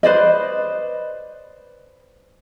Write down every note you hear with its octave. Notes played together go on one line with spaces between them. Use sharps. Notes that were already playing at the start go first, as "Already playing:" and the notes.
B4 C5 D5 D#5